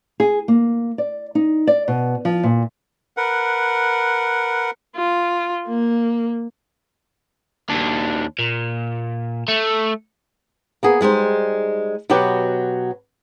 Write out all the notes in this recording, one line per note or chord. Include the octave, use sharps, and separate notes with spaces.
G#4
A#3
D5
D#4
D5
B2
F3
A#2
A#4 B4 F#5
F4
A#3
D#2 D4
A#2
A3
A#3 B3 G#4
G3 G#3 D#4 C5
B2 F#3 B3 F#4 G4